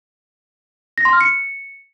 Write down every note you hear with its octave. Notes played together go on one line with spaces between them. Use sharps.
A#6
C6
F6
C#7